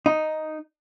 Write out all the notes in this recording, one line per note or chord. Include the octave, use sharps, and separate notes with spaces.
D#4